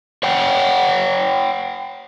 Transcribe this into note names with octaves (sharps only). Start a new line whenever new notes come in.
C#5 F#5 G5